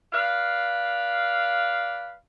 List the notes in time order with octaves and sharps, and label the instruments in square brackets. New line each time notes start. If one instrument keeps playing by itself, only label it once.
[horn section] B4 D5 F5